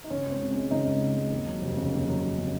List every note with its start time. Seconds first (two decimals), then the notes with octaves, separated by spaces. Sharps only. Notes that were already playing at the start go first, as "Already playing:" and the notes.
0.04 D#4
0.10 C#3 C#4
0.25 C#2
0.31 C4
0.41 C#2
0.51 G#3 C#4
0.71 C#3 D#4
0.86 C#2
1.02 C#2
1.17 G#3
1.32 D#2
1.47 F#3
1.62 F1
1.77 C#3
1.93 D#2
2.08 F#3
2.23 F1
2.38 C#3